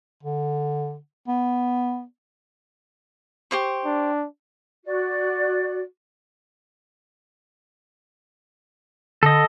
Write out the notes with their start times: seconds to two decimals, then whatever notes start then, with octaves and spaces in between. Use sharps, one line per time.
0.23 D3
1.28 B3
3.51 G4 C5 C#6
3.85 D4
4.85 F#4 D5
9.23 D3 A4 D#5